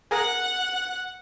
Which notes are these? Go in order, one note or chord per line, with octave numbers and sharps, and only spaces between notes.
G#4 A#4 F#5 F#6